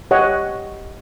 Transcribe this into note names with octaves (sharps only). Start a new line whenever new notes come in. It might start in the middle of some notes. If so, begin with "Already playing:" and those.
G4 C#5 D#5 F#5